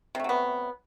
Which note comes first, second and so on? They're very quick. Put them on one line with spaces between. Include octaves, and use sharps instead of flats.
C3 A3 F#3 B3